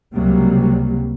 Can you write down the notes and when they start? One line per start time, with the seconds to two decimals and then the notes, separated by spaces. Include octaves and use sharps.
0.14 C#2 C3 F#3 G3 A#3